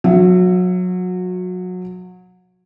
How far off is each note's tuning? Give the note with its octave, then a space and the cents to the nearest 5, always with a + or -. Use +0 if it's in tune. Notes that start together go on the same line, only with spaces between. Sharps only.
F#3 -25 E5 +20